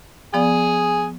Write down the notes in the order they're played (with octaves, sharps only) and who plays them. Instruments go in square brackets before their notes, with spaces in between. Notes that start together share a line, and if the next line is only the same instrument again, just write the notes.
[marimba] F3 B3 D5 [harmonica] G#4